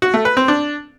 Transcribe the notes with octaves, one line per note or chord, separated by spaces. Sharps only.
F#4
A3
B4
C4
D4